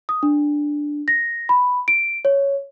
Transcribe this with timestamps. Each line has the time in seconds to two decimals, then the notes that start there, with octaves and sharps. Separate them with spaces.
0.09 D#6
0.23 D4
1.08 A#6
1.49 B5
1.88 D7
2.25 C#5